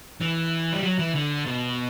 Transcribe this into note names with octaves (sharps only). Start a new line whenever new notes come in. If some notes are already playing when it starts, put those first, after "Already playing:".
E3
G3
F#3
E3
D3
B2